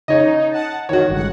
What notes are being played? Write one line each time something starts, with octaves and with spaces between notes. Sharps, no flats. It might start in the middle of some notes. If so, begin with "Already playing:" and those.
C#3 D#4 C#5 D#5
D#4
F#5 A5
D#3 F#4 C#5
G1 C#2 F#5